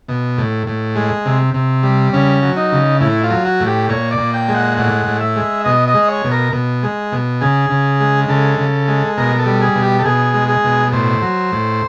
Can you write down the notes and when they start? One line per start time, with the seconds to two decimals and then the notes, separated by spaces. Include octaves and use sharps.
0.08 B2
0.38 A2
0.67 A2
0.95 G#3
1.25 C3
1.54 C3
1.83 G3
2.13 C#3 C#4
2.43 F#3
2.57 D#4
2.72 C#3
3.01 A2 E4
3.24 F4
3.30 F#3
3.45 F#4
3.60 A2
3.67 G4
3.89 A#2 C#5
4.11 D5
4.18 A#2
4.34 G5
4.48 G#3
4.55 F#5
4.77 A2 F#5
5.06 A2
5.21 E5
5.36 G#3
5.64 B2 D#5
5.88 D#5
5.94 G#3
6.08 C#5
6.24 B2
6.32 A#4
6.53 B2
6.83 G#3
7.12 B2
7.41 C#3 G#4
7.70 C#3
8.00 G#3
8.28 C#3 A4
8.59 C#3
8.88 G#3
9.18 B2 A#4
9.39 A4
9.46 G3
9.61 G#4
9.75 B2
9.83 G4
9.99 A4
10.04 B2 G#4
10.34 G#3
10.48 G#4
10.64 B2
10.92 A2 C5
11.22 F#3
11.52 A2